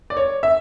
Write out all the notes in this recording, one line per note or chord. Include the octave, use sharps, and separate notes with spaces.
D5
C#5
E5